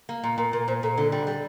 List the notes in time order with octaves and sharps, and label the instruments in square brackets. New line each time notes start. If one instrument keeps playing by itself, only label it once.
[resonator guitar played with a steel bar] A#3
A#2
[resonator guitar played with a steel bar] A#2 [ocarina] A#4
[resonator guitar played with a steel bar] A#2 [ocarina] A#4
[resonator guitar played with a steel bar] A#2 [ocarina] C5
[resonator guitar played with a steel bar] A#2 [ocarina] A4
[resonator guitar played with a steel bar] D3 [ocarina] A4
[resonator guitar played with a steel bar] G3
[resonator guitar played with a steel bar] G3 [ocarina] A4